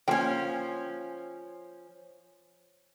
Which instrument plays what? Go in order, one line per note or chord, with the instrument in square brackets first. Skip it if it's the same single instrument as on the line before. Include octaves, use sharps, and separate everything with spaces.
[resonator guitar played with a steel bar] F3 C#4 [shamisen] A#3 G5